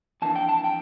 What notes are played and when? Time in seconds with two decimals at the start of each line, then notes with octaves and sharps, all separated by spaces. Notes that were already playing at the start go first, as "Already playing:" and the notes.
0.22 F2 E3 A#3 D4 A5
0.36 G5
0.49 A5
0.64 G5